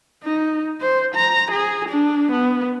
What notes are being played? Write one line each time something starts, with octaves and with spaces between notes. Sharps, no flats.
D#4
C5
A#5
G#4
D4
B3